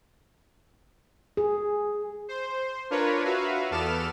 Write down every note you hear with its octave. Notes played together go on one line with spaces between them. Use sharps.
G#4
C5
D4 F4 A#4 B4 C#5
F#4 B4 E5 F5
E2 B3 A4 D6 F6 E7